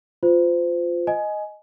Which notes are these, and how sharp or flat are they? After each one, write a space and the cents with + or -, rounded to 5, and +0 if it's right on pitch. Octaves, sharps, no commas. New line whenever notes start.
F4 +5 C5 -30
D#5 +0 G#5 +15